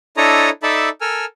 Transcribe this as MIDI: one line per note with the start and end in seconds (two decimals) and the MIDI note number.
0.17 0.50 62
0.17 0.50 64
0.17 0.50 69
0.17 0.50 73
0.17 0.50 75
0.17 0.50 82
0.63 0.89 63
0.63 0.89 69
0.63 0.89 74
0.63 0.89 76
0.63 0.89 81
0.63 0.89 83
1.01 1.25 69
1.01 1.25 70
1.01 1.25 80
1.01 1.25 88
1.01 1.25 89